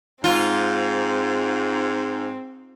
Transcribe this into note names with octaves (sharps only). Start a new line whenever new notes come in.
G#2 C4 F4